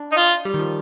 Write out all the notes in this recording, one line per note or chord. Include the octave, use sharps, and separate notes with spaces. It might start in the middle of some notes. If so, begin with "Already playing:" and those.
Already playing: D4
D#4
F4
G3
D#3
F3